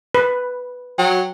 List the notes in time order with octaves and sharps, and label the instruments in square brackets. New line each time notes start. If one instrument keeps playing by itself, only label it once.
[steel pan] B4
[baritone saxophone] F#3 [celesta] G5